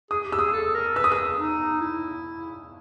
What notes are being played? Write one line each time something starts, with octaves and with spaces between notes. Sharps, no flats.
G#4 D#6
G4
E6
G#4 D#6
A4
A#4
B4 E6
D#6
G#4 E6
D#4
E4